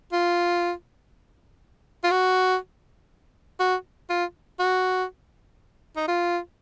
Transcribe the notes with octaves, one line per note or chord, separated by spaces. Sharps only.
F4
F4
F#4
F#4
F4
F#4
D#4
F4